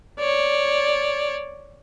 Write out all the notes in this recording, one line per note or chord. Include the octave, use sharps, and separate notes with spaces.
C#5 D5